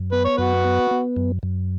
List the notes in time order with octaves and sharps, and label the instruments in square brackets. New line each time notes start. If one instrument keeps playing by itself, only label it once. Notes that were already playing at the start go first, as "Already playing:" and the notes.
Already playing: [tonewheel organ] F#2
[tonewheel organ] B3 [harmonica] B4
[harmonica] C#5
[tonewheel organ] F#2 [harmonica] F#4 B4
[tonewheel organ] B3
B3
F#2
F#2